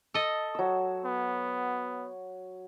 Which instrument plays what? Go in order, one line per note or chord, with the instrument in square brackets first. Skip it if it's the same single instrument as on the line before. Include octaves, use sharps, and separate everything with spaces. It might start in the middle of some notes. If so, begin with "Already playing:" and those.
[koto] A4 D#5
[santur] F#3 E6
[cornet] B3